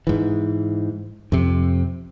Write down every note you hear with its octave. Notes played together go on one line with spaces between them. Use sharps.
G#2 E3
F2 C3